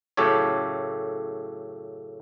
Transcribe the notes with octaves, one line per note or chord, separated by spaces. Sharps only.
F#2 A2 C#3 G4 A4 C#5